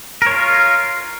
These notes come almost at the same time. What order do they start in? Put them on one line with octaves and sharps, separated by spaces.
A#4 C#5 F4